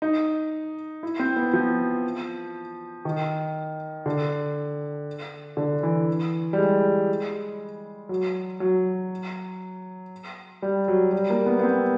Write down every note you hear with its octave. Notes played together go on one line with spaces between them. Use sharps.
D#4
E4
C4
B3
F3
D#3
D3
D3
E3
G3
G#3
F#3
F#3
G3
F#3
G3
A#3
B3
B3
C4